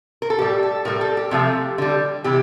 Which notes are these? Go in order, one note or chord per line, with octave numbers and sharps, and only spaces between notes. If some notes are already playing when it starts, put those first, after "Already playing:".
A#4
A4
A2 G3 G4
A4
A2 G3 A#4
A4
G4
C3 F3 A3
D3 G3
C3 E3 G4